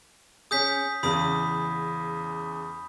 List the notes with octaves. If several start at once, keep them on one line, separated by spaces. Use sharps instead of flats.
C#4 G#4 D#6 G6 B6
E2 C#3 B5 D#6